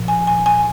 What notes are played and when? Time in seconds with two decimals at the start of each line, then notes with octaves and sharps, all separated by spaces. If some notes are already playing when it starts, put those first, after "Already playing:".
Already playing: A#2 F3
0.08 G#5
0.27 G#5
0.46 G#5